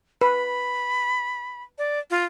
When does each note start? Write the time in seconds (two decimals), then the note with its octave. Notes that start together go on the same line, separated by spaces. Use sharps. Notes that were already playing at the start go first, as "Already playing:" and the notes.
0.21 B4 B5
1.78 D5
2.11 F4